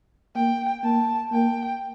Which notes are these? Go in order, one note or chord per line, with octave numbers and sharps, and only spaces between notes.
A#3 G5
A#3 A5
A#3 G5